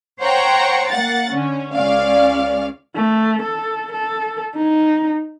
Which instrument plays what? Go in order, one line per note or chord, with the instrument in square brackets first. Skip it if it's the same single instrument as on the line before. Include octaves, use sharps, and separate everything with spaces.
[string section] C5 C#5 F#5 G5 A#5 C#6
A#3 F#5 A6
D3 C#4
C#2 C#4 D5 F5
[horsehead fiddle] A3
A4
A4
D#4